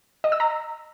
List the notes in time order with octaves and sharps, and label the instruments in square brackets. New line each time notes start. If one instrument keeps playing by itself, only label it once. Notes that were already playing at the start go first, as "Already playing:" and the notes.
[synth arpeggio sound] D#5
E6
A#5